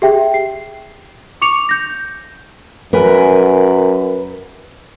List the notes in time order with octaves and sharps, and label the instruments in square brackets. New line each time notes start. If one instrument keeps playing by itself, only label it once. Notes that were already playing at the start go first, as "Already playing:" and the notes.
[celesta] G4 G#4 E5 G5
C7
C#6 D6 C#7 F7
G6 A#6
[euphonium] F#2 [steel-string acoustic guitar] A#4 B4 G#5